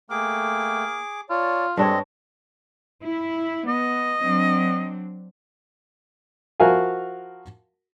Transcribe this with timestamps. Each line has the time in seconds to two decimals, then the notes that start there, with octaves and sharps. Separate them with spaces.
0.10 A3 A#3 G#4 G5 D6
1.30 F4 C#5 D5 A5
1.77 G2 G#3 C4 D4 A4 C#5 D#5
3.03 E4
3.68 B3 D#5
4.22 F#3 C4 D4
6.60 F3 F#4 A#4 E5 F5 G#5